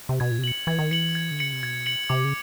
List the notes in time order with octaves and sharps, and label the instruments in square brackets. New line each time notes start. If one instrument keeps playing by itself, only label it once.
[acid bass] C3
[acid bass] B2 [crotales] G#6
[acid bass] A#2
C3
[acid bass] B2 [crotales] C#7 F#7
[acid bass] E3 [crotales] G#6
[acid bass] D#3
[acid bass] E3 [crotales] C#7 F#7
[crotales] G#6
[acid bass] D3
[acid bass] C#3 [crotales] C#7 F#7
[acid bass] C3
[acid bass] B2 [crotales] G#6
[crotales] C#7 F#7
[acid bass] C3 [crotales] D6
[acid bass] C#3